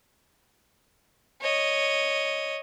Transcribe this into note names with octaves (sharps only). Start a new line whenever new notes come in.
C#5 D#5